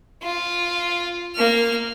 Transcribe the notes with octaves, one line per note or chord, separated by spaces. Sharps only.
F4
A#3 F6